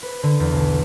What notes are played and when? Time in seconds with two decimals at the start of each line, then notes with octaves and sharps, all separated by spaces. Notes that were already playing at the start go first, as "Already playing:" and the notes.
0.02 B4
0.23 D3
0.40 E2
0.52 B1